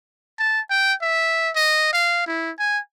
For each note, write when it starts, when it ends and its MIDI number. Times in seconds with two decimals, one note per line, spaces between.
0.39 0.60 81
0.70 0.93 79
1.02 1.50 76
1.56 1.90 75
1.93 2.25 77
2.27 2.51 64
2.59 2.79 80